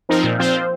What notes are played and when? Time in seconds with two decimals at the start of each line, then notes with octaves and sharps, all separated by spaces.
0.09 F3 C4 D#4 A#4
0.24 A#2
0.39 F3 C4 F4 C5